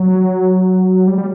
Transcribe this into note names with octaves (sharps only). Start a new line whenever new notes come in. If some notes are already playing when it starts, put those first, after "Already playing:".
Already playing: F#3
G3
G3